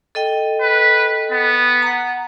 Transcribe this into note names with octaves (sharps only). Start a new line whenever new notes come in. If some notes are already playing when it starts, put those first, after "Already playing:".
A4 D#5 G5
B4
B3
F#5 A#5